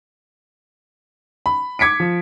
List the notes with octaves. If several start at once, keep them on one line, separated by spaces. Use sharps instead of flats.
B5
D6 G#6 B6 C#7 D7
F3